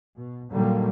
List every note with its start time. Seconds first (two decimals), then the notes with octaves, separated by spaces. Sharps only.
0.17 B2
0.52 A#2 D3 D#3 F#3 G3 A#3